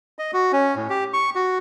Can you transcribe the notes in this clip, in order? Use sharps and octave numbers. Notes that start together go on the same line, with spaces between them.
D#5
F#4
C#4
A2
G4
C#6
F#4